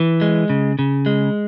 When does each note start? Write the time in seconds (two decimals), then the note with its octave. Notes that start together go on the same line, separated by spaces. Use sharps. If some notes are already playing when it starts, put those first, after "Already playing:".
Already playing: E3
0.21 G#3
0.50 C#3
0.79 C#3
1.06 G#3